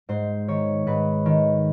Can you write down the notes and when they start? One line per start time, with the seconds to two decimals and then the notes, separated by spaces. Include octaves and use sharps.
0.09 G#2 C5
0.48 D#3 C#5
0.87 G#2 B4
1.26 D#3